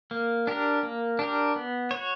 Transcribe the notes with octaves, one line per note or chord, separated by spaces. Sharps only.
A#3
D4 G4 A#4
A#3
D4 G4 A#4
B3
F#4 C#5